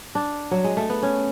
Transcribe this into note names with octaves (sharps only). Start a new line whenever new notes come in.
D4
F#3
G#3
A3
B3
C#4